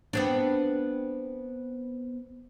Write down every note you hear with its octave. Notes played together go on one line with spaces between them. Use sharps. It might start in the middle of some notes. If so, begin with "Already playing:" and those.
B3 C4 D4